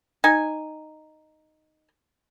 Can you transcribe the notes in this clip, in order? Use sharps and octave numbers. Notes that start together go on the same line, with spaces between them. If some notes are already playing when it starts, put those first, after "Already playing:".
D#4 G#5